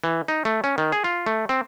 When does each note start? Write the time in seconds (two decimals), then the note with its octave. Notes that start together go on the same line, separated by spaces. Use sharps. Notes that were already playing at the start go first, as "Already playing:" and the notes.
0.04 E3
0.28 D#4
0.45 A3
0.64 C#4
0.78 D#3
0.92 G#4
1.04 F4
1.26 A3
1.49 C4